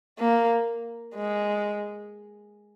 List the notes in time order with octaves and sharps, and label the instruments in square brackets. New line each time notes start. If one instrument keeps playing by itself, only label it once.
[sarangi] A#3
G#3